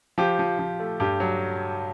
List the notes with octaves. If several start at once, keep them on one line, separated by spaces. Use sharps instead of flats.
F3 G4
F3
F3
A3
G2 G4
F#3